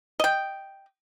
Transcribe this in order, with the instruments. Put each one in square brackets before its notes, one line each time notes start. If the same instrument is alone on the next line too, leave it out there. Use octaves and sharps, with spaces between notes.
[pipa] D#5 G5